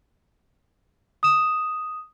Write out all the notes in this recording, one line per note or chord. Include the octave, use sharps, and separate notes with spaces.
D#6 E7